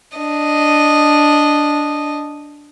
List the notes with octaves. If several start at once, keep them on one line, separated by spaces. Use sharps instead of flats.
D4 D#5